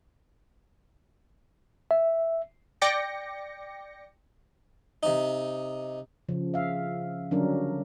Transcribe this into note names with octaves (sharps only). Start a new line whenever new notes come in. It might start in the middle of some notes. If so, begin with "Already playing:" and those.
E5
D5 G5 D6 A#6 C#7
C3 D#4
C#3 F3
E5 F5
D3 F#3 G3 C#4 D4 A#4